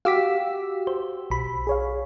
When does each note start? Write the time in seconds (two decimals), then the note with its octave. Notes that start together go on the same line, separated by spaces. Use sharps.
0.05 F#4 G4 F5 D6 E6 B6
0.87 C5
1.30 B1 B5
1.67 G#4 C#5 F5